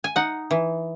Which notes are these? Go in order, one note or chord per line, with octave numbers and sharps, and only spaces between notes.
G#5
D#4 F#5
E3